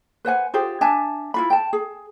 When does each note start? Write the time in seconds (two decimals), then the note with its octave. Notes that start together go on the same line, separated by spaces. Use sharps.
0.25 B4 C5 F#5 G#5
0.54 F4 G4 G#4 C5
0.81 D4 E5 G#5 A5
1.34 E4 F4 B5
1.50 G5 A5
1.73 G#4